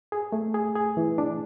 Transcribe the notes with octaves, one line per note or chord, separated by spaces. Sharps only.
G#4
A3
G#4
G#4
E3
D4